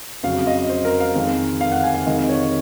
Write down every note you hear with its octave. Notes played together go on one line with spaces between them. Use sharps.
F2 C#3 F#3 F5
D#5
C5
A#4
F5
F2 D#3 G#3
F5
F#5
G#5
F5
F2 C3 D#3 G#3 D#5
C#5